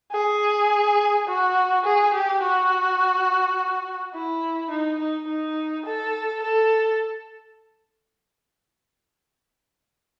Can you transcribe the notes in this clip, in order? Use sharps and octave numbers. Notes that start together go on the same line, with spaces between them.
G#4
F#4
G#4
G4
F#4
E4
D#4
D#4
D#4
A4
A4